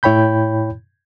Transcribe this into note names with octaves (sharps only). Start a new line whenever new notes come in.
A2 E4 C#5 G5 B5 G6